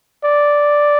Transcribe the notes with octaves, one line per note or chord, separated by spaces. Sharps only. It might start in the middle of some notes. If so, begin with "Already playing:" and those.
D5